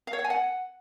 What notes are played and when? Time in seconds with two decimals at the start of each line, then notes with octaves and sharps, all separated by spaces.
0.07 F5
0.13 C#5
0.19 F#5
0.24 G#5
0.30 F#5